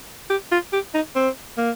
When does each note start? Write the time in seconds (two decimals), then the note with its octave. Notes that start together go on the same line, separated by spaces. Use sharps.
0.30 G4
0.52 F4
0.73 G4
0.94 D#4
1.16 C4
1.58 A#3